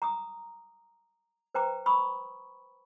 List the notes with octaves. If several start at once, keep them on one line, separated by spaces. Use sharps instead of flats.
A#5 D6 D#6
B4 C5 G5 A#5 D6
B5 C#6 D#6 E6